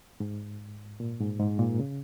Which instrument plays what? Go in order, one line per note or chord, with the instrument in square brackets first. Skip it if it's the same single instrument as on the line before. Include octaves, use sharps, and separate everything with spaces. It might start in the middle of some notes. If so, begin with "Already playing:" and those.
[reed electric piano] G#2
A#2
G#2
G#2
A#2
C#3